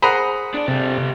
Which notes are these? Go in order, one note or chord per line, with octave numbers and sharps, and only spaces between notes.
G#4 A#4 C5 F#5 A#5 B5
D4 D5
C3 G3 A4